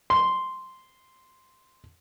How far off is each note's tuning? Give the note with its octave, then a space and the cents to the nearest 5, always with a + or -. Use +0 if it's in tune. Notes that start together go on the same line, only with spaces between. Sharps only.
C6 -5